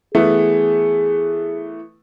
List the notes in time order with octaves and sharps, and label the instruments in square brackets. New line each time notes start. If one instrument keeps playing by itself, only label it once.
[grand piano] E3 A3 B3 [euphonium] G#4